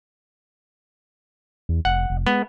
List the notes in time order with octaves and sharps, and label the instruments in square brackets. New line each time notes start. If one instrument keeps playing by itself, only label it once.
[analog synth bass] E2
[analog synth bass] F1 [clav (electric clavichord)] F#5
[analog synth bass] F1
[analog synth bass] G#3 [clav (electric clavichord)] B3